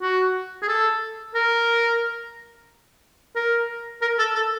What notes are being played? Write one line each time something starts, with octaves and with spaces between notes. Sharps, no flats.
F#4
G#4
A4
A#4
A#4
A#4
A4
A4